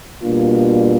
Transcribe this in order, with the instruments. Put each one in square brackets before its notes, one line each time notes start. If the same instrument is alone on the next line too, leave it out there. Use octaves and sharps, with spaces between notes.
[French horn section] B2 G3 A#3 D4 F4